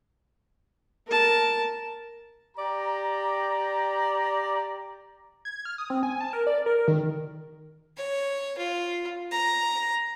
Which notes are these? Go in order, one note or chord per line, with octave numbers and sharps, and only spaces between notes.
A#4 A5
G4 D5 A#5
G#6
F6
D#6
C4
G#5
A5
A#4
D5
A#4
D#3
C#5
F4
A#5